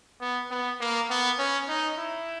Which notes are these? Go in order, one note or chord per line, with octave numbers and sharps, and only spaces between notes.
B3
B3
A#3
B3
C#4
D#4
E4